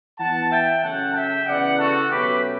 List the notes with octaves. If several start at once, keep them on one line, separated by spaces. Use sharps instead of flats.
E3 B3 F#5 A5
E5 G5
C#3 F#3 A3 C#4 F#5 A5
E5 G5
C#3 E3 B3 D5 F#5
F#4 A4
B2 F#3 A3 C#4 G4 B4